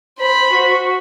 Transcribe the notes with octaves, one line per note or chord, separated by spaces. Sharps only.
C5 B5
F#4